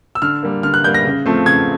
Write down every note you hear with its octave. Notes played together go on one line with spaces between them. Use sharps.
E6
D3 F6
G3 A#3
D3 F6
F#6
G3 A#3 G6
A#6
C#3
F3 A3 C4
C#3 G#6